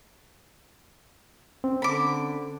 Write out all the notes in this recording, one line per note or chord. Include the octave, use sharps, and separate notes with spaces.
C4 C#4
D3 B5 D6